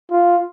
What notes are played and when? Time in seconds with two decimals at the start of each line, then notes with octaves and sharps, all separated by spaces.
0.11 F4